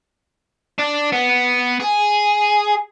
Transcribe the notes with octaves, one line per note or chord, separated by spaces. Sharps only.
D4
B3
G#4